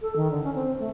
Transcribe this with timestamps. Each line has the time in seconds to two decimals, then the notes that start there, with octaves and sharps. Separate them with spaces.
0.02 A4
0.16 D#3
0.31 D3
0.44 C#4
0.55 C4
0.80 A3